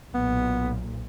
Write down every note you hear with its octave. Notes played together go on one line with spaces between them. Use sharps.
B1 A#2 B3